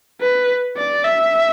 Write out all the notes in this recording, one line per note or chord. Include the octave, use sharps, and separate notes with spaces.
B4
D5
E5